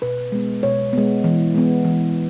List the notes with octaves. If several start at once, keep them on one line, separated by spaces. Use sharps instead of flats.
B2 B4
G#3 B3
B2 C#5
G#3 B3
E3
G#3 B3
E3